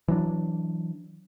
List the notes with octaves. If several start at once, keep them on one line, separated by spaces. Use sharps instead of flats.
E3 F#3 D4